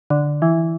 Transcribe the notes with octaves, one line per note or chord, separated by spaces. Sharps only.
D3
E3